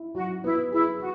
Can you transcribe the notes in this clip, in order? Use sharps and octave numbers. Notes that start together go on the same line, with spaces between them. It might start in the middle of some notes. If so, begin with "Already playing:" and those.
Already playing: E4
F#3 F#4
B3 E4
E4 G#4
F#4